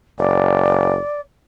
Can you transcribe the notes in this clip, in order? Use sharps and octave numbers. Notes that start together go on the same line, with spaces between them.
F#1 D5